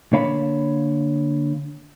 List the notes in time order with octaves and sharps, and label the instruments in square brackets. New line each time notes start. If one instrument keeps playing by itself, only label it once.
[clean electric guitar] D3 A#3 C#5 F5 A5 B5